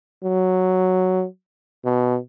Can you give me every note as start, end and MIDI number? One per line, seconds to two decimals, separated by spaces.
0.24 1.25 54
1.85 2.17 47